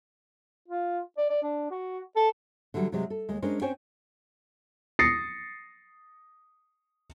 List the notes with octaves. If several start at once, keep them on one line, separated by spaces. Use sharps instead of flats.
F4
D5
D5
D4
F#4
A4
D3 E3 F#3 G3
C3 F#3 G#3 G4
A4
D#2 G#3
G#3 C#4 D4 A#4 C5
C4 C#4 C5 C#5 G5 G#5
D#6 A6 A#6 C7 C#7